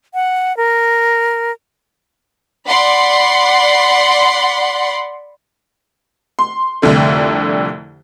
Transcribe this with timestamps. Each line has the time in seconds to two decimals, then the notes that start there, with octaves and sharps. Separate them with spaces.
0.14 F#5
0.57 A#4
2.67 D5 F#5 B5 C6
6.39 C6
6.82 C2 F2 D3 A3